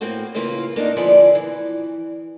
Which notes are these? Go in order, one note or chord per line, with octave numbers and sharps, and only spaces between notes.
A2 A#3 C4 F#4
C#3 E3 A#3 F4
A#3 D4 D#4
D3 F3 B3 E4 G#4 D5
E3